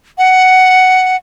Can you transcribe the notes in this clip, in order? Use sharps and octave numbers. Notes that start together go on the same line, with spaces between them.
F#5